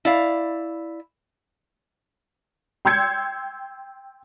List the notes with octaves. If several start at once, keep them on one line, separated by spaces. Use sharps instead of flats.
E4 D5 F5
G5 C6 E6 G6 G#6 C#7